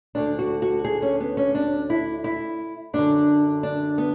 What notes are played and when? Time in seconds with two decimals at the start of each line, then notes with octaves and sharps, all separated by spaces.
0.15 D2 D3 D4
0.39 F#4
0.62 F#4
0.85 G#4
1.02 C#4
1.20 B3
1.37 C#4
1.55 D4
1.90 E4
2.24 E4
2.93 F#2 D3 D4
3.63 D4
3.98 B3